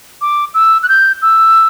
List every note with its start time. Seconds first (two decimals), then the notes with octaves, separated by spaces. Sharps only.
0.21 D6
0.54 E6
0.83 F#6
0.89 G6
1.22 E6